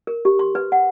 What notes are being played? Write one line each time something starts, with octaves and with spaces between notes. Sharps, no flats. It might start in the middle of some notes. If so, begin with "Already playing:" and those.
A#4
G4
C6
B4
F#5